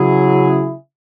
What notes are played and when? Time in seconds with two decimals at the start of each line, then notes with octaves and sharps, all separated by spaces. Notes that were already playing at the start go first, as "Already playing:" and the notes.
Already playing: C#3 F#3 E4 G#4